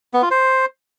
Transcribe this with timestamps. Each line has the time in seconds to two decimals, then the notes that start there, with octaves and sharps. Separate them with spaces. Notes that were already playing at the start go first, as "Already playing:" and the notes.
0.14 B3
0.22 F4
0.31 C5